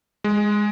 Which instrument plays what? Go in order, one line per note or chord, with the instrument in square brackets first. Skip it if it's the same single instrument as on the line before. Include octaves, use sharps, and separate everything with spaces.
[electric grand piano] G#3